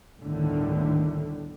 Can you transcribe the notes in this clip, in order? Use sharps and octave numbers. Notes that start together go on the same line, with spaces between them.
G1 D2 A2 D3 D#3 A3